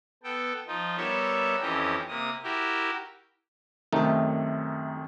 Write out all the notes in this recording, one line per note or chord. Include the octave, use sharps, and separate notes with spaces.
B3 A4 G5
F3 D#4 F4
G3 B3 A4 A#4 C#5 E5
F2 E3 C#4 G4 D#5
C3 A#3 D#6
E4 F#4 G4 A#4
F#2 C3 D#3 A3 D#4